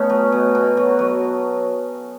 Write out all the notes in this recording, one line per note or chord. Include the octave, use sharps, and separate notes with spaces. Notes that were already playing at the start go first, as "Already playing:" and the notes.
Already playing: B2 A3 B3 C#4 D#4
F#3
B2
B2
F#3
F#3